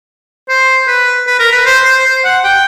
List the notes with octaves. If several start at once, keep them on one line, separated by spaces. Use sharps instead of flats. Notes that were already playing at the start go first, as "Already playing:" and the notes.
C5
B4
B4
A#4
B4
C5
C5
C5
F#5
G5